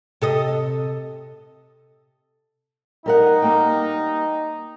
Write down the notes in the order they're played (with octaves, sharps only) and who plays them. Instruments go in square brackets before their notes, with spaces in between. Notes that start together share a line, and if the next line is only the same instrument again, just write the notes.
[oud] C3 A4 D#5
[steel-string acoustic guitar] G3 A#4 F#5 [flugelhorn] D#4
[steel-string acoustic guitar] G3 A#3 G5